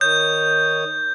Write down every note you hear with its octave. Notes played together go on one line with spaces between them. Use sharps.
D#3 C#5 D#6 G6